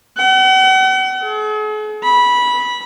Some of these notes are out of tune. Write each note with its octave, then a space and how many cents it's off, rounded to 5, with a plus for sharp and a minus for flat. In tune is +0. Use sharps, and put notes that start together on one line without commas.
F#5 +40
G#4 +45
B5 -15